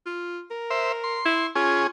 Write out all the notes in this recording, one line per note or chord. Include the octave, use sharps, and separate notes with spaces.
F4
A#4
C5 E5
C6
E4
C#4 F4 G#4